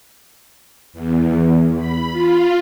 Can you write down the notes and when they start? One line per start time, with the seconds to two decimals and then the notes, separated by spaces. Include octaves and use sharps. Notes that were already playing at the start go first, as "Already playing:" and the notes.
0.93 E2
1.76 B5
2.11 F4